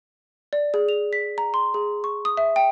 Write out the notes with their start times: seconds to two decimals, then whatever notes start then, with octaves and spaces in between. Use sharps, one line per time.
0.53 D5
0.74 G#4
0.89 F7
1.13 B6
1.38 A#5
1.54 C6
1.74 G#4
2.04 C#6
2.25 D#6
2.37 E5
2.56 G5